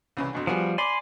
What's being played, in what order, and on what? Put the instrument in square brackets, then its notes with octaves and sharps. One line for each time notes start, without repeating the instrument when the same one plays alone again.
[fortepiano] C2 C#3 E3
F2 B2 D3
[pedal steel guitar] F3 G3 [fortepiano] B3 F#4 G#4
[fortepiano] D5 D6 [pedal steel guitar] G#5 B5 C6